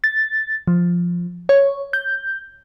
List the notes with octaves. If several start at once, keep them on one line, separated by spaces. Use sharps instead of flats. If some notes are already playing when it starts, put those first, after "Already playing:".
A6
F3
C#5
G6